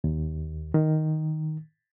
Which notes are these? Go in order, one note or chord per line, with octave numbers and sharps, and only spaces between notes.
D#2
D#3